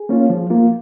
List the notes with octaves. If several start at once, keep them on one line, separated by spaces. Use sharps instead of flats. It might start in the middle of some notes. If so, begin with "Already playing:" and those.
Already playing: G#4
A#3 C#4 F4
F3
A#3 F4